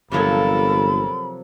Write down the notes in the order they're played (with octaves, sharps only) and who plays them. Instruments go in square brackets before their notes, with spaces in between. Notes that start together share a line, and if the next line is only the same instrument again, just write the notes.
[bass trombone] G1 [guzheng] C3 F3 F#3 [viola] A4 A#4 [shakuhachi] B5